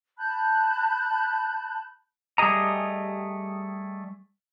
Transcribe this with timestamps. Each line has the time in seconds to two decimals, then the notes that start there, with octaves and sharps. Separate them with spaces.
0.17 A5 B5 F#6 G6
2.38 G3 A3 G4 G#4 D#5 A#5